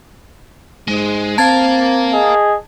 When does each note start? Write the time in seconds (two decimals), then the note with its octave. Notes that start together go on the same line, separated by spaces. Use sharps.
0.88 G#2 G#3
1.38 C4 A#4 F5 A5 G#6 A6
2.12 G#4 D#5